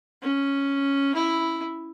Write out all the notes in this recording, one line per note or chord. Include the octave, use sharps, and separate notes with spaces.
C#4
E4